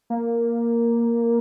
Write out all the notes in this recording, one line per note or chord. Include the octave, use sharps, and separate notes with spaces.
A#3